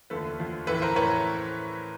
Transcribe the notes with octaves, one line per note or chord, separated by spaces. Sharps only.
D#2 D3 F3 A3 A4 B4
D#2 D3 F3 A3
A2 E3 A3 A4 B4
A#4 C5
A2 B4 C#5